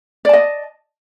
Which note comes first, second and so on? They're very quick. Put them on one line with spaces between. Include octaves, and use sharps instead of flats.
D5 A5 D#5